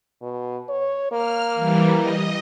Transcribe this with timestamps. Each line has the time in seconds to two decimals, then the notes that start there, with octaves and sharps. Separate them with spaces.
0.22 B2
0.68 C#5
1.12 A#3 F6
1.54 E3 G3
1.95 D#5